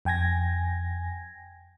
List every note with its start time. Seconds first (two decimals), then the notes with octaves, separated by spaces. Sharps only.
0.05 F2 G5 G#5 G#6 A#6